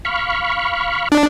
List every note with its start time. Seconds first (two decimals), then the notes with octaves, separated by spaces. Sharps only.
0.05 F5 B5 C#6
1.12 D4